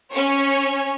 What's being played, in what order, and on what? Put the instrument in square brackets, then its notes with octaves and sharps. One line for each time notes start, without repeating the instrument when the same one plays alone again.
[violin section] C#4 C#5